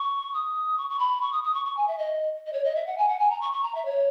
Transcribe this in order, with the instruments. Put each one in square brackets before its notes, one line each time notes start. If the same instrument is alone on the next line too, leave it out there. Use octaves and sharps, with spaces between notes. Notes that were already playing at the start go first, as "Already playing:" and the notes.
Already playing: [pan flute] C#6
D#6
C#6
C#6
B5
C#6
D#6
D#6
C#6
C#6
G#5
E5
D#5
D#5
C#5
D#5
E5
F#5
G#5
F#5
G#5
A#5
C#6
C#6
A#5
E5
C#5